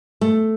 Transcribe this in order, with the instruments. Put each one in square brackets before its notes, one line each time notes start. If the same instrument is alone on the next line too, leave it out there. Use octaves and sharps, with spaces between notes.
[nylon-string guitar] A3